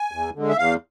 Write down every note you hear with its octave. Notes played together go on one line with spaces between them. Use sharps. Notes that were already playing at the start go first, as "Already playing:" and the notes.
Already playing: G#5
E2
D3 G#3
E5
E2 F5